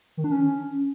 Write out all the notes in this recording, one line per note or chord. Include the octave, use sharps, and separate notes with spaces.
D#3
D4
C#4